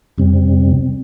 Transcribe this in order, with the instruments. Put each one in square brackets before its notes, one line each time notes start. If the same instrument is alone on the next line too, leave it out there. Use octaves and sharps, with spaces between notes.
[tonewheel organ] F2 C3 G3 C4